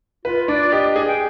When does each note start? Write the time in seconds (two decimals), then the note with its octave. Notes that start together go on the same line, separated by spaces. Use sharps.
0.25 F4 B4
0.48 D4 D5
0.72 G4 D#5
0.96 G#4
1.08 G5